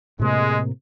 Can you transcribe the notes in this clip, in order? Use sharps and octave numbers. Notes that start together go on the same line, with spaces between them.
A2 C3 G#3 A#3